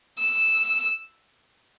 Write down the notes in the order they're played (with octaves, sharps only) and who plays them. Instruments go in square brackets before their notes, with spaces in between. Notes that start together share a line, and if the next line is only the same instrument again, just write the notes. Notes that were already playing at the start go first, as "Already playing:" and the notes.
[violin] E6